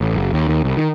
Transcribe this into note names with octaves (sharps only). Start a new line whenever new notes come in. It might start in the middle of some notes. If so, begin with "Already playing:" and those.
A1
F#1
D#2
D#2
C2
D#3